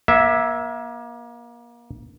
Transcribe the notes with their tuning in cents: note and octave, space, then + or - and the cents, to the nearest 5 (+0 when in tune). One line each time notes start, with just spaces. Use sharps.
A#3 +30 E5 -5